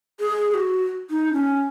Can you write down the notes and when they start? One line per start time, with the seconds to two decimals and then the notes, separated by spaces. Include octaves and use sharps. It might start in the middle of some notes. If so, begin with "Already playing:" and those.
0.20 G#4
0.51 G#4
0.54 F#4
1.10 D#4
1.33 C#4